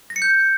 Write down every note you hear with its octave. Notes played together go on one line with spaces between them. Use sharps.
A#6
C#7
G6